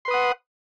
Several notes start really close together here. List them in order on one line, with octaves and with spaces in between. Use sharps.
C6 B4 D#6 F#5